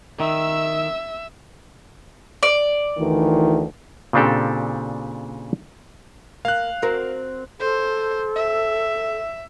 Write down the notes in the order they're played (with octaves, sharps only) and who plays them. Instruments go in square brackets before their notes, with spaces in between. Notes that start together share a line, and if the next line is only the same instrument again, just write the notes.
[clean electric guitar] D#3 [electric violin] E5 E6
[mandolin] D5
[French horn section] D2 D#3 E3
[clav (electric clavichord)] A#2 C#3 C4 D4 G4 A4
[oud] A#3 [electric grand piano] F5 F#6
[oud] C4 F#4 A#4
[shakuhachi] A4 [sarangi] C5
[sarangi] E5